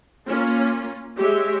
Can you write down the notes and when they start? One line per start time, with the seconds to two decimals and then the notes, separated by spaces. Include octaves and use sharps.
0.26 A#3 C#4 F4
1.17 G#3 G4 C#5 E5